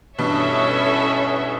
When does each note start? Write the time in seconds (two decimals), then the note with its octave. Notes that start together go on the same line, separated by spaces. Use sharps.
0.19 G2 B2 C#4 E4 A4 C#5 E5